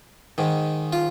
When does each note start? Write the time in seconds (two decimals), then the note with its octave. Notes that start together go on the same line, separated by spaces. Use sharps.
0.38 G#2 D#3
0.93 F4